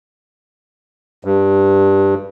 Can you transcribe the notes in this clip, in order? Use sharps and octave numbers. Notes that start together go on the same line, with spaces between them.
G2